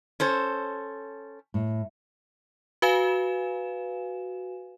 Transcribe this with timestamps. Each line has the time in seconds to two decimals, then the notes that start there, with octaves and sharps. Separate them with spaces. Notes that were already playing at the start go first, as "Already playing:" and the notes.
0.20 C#4 A4 C5
1.54 A2
2.82 F#4 B4 F5 G#5 E7